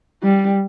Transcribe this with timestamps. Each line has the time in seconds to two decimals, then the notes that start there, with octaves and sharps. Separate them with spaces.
0.24 G3